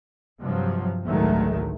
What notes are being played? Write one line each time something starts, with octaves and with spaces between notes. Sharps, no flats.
G2 C3 F3 F#3
A1 D2 D#3 F#3 G#3 A3